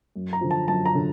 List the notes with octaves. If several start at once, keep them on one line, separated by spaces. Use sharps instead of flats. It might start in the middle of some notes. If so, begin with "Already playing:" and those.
F#2
A#5
D3 F3
A5
F#2 A5
A#5
D3